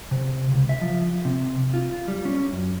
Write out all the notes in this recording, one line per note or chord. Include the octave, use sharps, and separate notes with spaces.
C3
C#2
E5
F3
C3
F4
G3
C#4
F#2